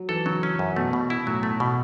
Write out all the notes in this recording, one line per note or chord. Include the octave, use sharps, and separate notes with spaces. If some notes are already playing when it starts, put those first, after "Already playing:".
Already playing: F#3
E3 A4
C#3 F#3
C#4
F#2
B2 A3
B2
E4
A2 F#3
A3
B2